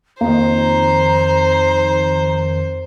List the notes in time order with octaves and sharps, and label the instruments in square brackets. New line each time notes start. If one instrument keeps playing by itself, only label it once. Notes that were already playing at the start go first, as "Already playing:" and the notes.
[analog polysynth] F2 D#3 [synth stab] A#3 [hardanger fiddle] C5 [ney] A#5